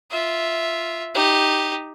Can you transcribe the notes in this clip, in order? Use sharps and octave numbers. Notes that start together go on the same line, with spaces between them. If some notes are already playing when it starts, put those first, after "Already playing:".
F4 E5
D#4 G4